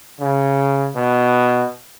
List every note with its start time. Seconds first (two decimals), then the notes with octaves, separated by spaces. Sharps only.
0.20 C#3
0.96 B2